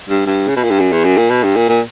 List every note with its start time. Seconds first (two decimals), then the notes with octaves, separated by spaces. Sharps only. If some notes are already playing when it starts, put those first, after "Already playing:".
0.10 G2
0.26 G2
0.48 C#3
0.56 B2
0.64 A#2
0.71 G2
0.79 F#2
0.92 E2
1.05 F#2
1.17 A#2
1.30 B2
1.44 G2
1.56 A#2
1.69 A#2